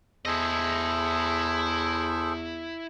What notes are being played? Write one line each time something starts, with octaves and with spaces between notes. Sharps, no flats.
E2 E4 G#4 A4 C5 D#5